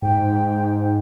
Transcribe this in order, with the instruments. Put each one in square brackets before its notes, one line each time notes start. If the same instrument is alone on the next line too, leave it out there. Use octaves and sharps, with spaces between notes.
[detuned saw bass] G#2 [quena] G5